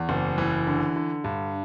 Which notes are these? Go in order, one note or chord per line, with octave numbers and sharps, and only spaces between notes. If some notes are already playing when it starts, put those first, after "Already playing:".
Already playing: E2
F#1
E3
D3
D3
G2